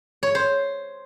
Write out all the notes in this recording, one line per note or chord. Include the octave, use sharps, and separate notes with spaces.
C#5
C5